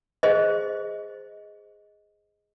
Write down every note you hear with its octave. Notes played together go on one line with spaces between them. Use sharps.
G#4 C5 D#5